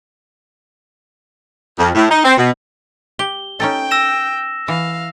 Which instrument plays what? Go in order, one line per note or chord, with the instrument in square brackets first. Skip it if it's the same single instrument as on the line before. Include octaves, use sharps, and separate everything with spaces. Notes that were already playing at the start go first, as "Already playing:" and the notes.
[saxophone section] F2
A2
D#4
C4
B2
[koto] G4 [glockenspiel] G7
[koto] C#4 D#4 A4 [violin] G5
[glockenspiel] E6 A#6 E7
[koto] E3 [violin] F5